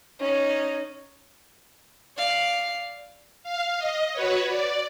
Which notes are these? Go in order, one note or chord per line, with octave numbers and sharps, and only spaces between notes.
C#4 D#4
D5 F5
F5
D#5
F#4 B4 C#5
D5